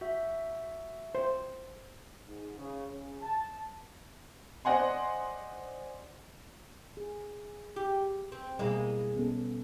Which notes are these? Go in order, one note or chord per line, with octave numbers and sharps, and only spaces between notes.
F#4 E5
C5
G#2
C#3
C#3
A5
C5 D5 D#5 F#5 G#5 C6
G#4
G4
C4
B2 G3 G#3 A#3 E4
B3 C#4 A4